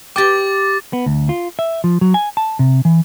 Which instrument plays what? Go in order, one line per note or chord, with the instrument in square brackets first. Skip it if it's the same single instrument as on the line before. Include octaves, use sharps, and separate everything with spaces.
[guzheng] G4 G5 [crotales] D6 A6
[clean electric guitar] B3
D2
F4
E5
F3
F#3
G#5
A5
C3
E3